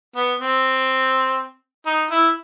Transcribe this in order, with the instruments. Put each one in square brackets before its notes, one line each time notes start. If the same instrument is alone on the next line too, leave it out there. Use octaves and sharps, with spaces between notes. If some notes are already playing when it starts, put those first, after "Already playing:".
[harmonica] B3
C4
D#4
E4